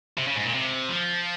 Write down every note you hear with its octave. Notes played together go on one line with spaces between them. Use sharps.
C3
C#3
G#2
A#2
C3
F3